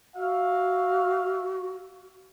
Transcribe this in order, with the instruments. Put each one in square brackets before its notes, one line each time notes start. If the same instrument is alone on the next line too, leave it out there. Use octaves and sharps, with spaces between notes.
[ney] F#4 [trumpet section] E5 F5